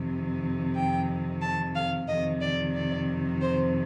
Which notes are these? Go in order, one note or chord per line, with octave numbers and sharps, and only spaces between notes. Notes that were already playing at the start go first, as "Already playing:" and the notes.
Already playing: F2 C3 D#3
G5
A5
F5
F2 C3 D#3 D#5
D5
D5
C5